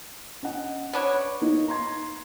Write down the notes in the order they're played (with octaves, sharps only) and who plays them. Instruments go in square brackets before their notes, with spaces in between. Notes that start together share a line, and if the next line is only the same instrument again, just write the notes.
[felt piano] C#4 D#5 F#5
[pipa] B3 D4 C#5
[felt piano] A#3 D#4
A#5 C6 G#6